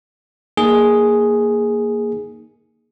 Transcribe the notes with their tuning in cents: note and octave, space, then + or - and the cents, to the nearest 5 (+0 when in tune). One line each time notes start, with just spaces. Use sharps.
A#3 +0 D#4 +0 G#4 +0